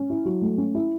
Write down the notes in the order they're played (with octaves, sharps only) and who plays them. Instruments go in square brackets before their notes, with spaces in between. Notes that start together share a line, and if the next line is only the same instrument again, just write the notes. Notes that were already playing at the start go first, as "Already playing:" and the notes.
Already playing: [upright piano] C#4
E4
F#3
A3
C#4
E4